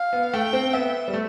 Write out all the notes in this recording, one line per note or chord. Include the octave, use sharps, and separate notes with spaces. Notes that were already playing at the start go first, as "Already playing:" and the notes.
Already playing: F5
B3
A3 G5
C4
B3 E5
G3
A3